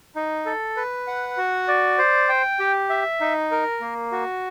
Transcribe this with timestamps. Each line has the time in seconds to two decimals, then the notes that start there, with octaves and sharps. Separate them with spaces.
0.16 D#4
0.46 A4
0.77 B4
1.07 F#5
1.37 F#4
1.68 D5
1.98 C5
2.29 G5
2.60 G4
2.90 E5
3.21 D#4
3.51 A#4
3.81 A#3
4.12 F#4